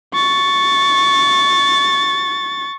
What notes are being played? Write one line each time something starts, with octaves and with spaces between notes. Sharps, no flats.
C#6 A6